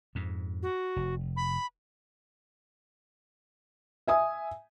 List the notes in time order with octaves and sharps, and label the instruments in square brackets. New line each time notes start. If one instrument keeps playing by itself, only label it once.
[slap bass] F2 G#2
[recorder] F#4
[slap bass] F1
[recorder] B5
[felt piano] E5 G#5 D#6